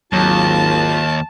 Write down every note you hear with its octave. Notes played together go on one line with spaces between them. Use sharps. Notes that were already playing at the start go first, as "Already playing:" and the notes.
G#1 D#2 F#3 F4 A5